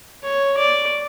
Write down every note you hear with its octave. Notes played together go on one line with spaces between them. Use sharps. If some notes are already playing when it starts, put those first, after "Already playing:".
C#5
D5